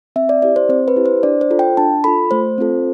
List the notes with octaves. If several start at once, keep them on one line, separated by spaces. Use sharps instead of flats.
C4 E5
D5
E4 G4 D5
C5
C4 C5
B4
E4 G4
C5
D4 D5
C5
F4 A4
G5
D4 A5
F4 A4 B5
A3 C5
C4 F4 A4